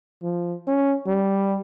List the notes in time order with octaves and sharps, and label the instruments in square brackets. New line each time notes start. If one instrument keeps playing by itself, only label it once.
[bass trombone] F3
C#4
G3